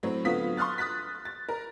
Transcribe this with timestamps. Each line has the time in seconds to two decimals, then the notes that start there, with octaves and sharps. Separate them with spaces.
0.03 A2 F#3 C4
0.25 D3 F#3 B3 F4 D#6 B6
0.57 C6 C#6 D#6 F6 F#6 A6
0.78 D#6 F#6 A6 B6
1.25 A6
1.49 A#4